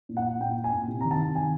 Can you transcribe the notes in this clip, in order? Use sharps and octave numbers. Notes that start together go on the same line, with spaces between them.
A#2
F#5
A#2
A#2 G5
A#2
G#5
A#2
C3
D#3 A#5
A5
C3
D#3 G#5